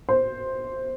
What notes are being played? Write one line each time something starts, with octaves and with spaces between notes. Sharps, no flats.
C5